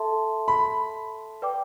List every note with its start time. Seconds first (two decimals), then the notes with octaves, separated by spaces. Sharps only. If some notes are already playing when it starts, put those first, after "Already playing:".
Already playing: A4 E5 A5 C6
0.48 B5
1.42 B4 D5 G5 D6